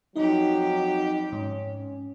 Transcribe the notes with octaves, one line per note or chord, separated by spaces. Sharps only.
F2 F#3 D#4 G4 D#5
G#2 C#4